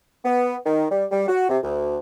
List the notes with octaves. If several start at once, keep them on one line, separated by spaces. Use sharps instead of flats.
B3
D#3
G3
G3
F#4
C3
D2